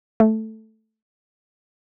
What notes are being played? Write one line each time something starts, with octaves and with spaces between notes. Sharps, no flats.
A3